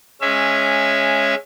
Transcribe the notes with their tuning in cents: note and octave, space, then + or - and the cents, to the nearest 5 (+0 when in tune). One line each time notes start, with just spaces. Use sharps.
G#3 +0 C#4 -10 E5 +20